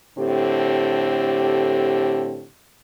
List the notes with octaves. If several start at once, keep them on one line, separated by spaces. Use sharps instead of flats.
A2 D3 C4 G4